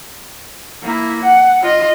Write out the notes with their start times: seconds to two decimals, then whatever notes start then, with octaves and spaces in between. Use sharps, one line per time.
0.83 A#3 E4
1.24 F#5
1.62 F4 D#5